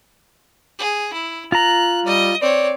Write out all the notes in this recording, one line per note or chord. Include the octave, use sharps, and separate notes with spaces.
G#4
E4
F4 A#5 F#6
G3 D#5
C4 C#5 D5